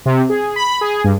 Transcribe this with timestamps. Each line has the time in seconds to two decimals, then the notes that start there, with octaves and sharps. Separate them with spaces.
0.06 C3
0.29 G#4
0.56 B5
0.81 G#4
1.04 G2